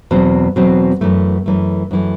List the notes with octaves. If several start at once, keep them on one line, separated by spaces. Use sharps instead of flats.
E2 B2 F#3 C4
E2 B2 F#3 C4
F#2 E3 A3
F#2 E3 A3
F#2 E3 A3